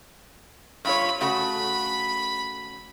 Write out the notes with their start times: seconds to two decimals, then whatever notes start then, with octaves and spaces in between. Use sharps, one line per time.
0.85 G2 F4 C#5 B5
1.21 C#3 A3 F#4 B5